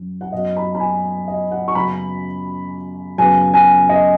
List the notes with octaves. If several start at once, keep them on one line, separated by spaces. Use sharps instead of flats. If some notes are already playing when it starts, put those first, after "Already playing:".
Already playing: F#2 F#3
F#5
F#2 F#3 B3 D#5
B5
B5
G#5
D#5
F#5
C#6
F#2 C#3 B3 B5
F#2 C#3 B3 G#5
G#5
D#5